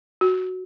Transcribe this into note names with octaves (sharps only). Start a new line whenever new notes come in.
F#4